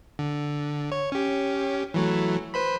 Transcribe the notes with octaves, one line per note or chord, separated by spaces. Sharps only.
D3
C#5
C#4 G4
E3 F#3 A3
B4 C5 B5